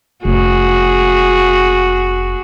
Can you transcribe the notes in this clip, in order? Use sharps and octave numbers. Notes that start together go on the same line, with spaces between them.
F1 C#4 F#4 G#4